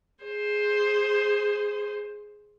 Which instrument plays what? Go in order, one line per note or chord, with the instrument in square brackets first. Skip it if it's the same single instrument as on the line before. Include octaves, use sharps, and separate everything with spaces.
[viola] G#4 C5